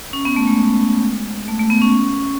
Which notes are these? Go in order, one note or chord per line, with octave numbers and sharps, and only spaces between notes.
C#4
B3
A3
G#3
A3
A3
B3
C#4